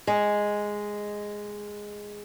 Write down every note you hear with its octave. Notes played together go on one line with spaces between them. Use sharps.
G#3